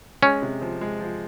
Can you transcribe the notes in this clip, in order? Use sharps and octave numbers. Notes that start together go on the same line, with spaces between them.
G#3 C#4
C3
F3
G#3
F3